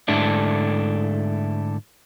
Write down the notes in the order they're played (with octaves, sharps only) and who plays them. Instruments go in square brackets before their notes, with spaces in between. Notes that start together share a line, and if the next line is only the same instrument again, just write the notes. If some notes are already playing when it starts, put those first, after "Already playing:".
[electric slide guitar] G#2 D3 A3 D4 E4